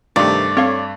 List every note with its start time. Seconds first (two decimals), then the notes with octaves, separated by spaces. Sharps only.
0.16 G2 C3 D#3 A3 D5
0.57 C4 A4 C#5 F5